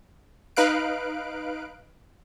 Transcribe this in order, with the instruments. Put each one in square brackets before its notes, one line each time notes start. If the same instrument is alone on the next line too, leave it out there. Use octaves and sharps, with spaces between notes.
[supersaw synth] D#4 B4 F5 F#6 D7